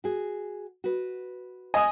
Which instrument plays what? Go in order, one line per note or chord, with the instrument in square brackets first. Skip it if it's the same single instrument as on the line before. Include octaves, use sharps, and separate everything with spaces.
[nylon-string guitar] F#4 G#4
F#4 B4
[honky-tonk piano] D#5 D#6 [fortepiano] G#5